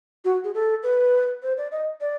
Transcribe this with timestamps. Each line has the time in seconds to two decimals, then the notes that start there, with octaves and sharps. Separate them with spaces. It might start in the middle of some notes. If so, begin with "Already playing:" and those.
0.25 F#4
0.44 G#4
0.54 A4
0.83 B4
1.43 C5
1.57 D5
1.71 D#5
2.01 D5